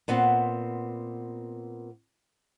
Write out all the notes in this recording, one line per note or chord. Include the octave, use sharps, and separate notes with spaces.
A#2 B3 C4 F5 F#5